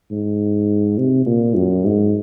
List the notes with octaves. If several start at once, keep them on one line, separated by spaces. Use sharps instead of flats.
G#2
C3
A#2
F#2
G#2